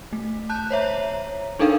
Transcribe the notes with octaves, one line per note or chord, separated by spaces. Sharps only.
A3
A5 F#6 G6
C5 C#5 E5 A#5
D4 D#4 A4 A#4 F5 G5